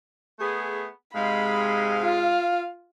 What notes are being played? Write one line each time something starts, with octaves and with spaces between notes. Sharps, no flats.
A3 B3 G#4
G#2 C3 G#3 F5 B5
F4